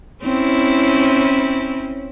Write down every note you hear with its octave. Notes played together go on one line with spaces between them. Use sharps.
C4 C#4 E4